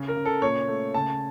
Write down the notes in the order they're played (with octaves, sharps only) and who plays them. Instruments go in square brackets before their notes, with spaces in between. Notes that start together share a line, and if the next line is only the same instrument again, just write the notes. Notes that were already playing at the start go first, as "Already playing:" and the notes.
Already playing: [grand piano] C#3
A#4
C#3
A4
A#2 C#5
A3
C#3 A5